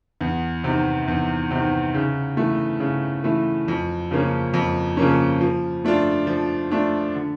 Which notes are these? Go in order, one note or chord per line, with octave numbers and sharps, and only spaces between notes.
E2
C3 D#3
E2
C3 D#3
C#3
E3 A3
C#3
E3 A3
F2
C#3 F3 A#3 C#4
F2
C#3 F3 A#3 C#4
F3
A3 D4 F4
F3
A3 D4 F4
D3